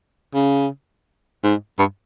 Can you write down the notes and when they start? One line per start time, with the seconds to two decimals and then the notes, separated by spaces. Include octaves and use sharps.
0.34 C#3
1.43 G#2
1.79 G2